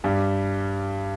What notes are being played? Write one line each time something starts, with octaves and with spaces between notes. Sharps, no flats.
G2 G3